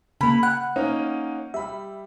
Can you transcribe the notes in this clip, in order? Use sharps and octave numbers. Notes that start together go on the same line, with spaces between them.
C#3 A#3 B5
F#5 F#6
A#3 C#4 D#4
G3 E5 B5